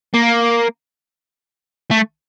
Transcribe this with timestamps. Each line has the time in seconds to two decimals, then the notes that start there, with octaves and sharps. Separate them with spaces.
0.14 A#3
1.91 A3